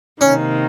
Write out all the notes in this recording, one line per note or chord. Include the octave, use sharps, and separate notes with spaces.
C3 D#3 A#3 C#4